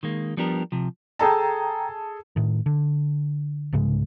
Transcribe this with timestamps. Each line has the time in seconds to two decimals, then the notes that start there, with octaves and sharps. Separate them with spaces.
0.03 D#3 G#3 A#3
0.37 F3 G3 B3 D4 G4 A#4
0.72 C3 F3
1.19 G#4 A4 G5 A5 A#5
2.36 A2 D#3
2.66 D3
3.73 C2 G#2 C#3 G#3